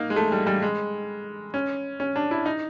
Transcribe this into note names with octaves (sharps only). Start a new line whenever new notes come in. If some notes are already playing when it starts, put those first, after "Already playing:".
Already playing: A#3 D#4
G#3
A3
G3
G3
G#3
C#4
C#4
D4
E4
D#4